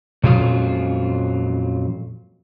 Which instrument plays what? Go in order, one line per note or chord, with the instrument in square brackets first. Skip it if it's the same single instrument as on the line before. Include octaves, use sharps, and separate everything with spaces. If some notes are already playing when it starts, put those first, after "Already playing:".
[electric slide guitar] F2 F#3 F4 [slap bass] A#2 G#3 C#4